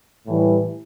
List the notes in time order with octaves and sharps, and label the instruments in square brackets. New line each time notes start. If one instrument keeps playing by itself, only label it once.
[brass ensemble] A2 E3 G3